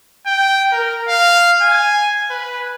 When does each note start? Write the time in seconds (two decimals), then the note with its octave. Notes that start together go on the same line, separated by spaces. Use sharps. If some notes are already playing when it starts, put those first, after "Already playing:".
0.27 G5
0.72 A#4
1.09 F5
1.62 G#5
2.30 B4